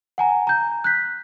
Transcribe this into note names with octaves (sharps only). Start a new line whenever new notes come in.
F#5 G#5 A#5
A#5 G6
F#6 G6 B6